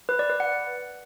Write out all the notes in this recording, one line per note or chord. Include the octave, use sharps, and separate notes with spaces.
B4
D5
B4
F#5